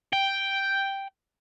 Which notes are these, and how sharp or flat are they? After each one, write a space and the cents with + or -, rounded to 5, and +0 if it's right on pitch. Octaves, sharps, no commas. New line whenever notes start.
G5 +0